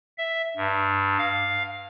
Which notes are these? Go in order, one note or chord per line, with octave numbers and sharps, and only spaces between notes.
E5
G2
F5